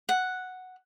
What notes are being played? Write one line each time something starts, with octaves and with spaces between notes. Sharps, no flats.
F#5